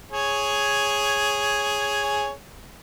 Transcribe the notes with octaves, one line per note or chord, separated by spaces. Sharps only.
G#4 C#5